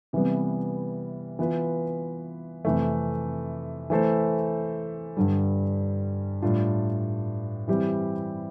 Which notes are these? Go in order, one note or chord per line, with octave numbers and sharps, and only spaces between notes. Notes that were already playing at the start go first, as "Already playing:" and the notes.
C3 E3 G3 B3
E3 B3 F4 B4
F2 C3 E3 A3
E3 A3 E4 A4 C5
G2 D3 G3
A2 G3 D4 F4
E3 G3 C4 E4 G4